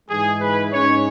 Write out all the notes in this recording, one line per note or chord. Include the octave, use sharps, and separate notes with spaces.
G#2 E3 G#3 G#4
B4
G#2 G#3 C#4 C#5